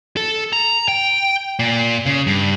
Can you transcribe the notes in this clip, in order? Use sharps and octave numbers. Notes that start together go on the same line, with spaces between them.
A4
A#5
G5
A#2
C#3
G2